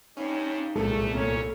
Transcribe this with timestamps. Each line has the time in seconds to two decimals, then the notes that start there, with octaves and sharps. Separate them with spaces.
0.17 G2 C#4 D#4
0.76 C2 A#2 G#3 A3 C4 G#4 A4
1.15 C#3 A#3 C#4 A4 C#5